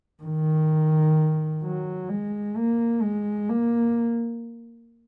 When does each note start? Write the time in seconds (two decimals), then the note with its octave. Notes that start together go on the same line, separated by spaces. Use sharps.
0.24 D#3
1.63 F#3
2.09 G#3
2.56 A#3
3.02 G#3
3.49 A#3